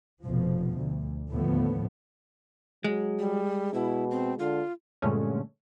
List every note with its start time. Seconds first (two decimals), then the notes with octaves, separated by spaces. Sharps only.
0.24 F1 B2 F3
0.74 D2
1.30 D#2 A2 D3 F3 A3 B3
2.84 F#3 G#3
3.19 G3
3.74 B2 E4
4.11 C4
4.39 D3 F4
5.02 G2 A#2 D3 G#3 A3 C#4